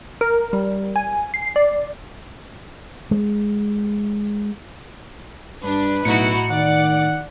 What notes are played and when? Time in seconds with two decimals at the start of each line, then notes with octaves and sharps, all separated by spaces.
0.21 A#4
0.53 G3
0.96 G#5
1.34 C7
1.56 D5
3.11 G#3
5.64 G2 D4 B4
6.05 B1 A2 D#4 E4 F#4 C#7
6.50 D#3 D5 F#5